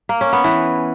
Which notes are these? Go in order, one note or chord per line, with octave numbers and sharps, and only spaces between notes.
A#3
C#4
B3
E3